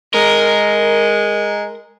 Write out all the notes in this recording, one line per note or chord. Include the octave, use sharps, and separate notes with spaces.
G#3 A#4